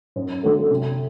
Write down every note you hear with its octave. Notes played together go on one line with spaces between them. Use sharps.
F#2
D3 F#3 A3
C3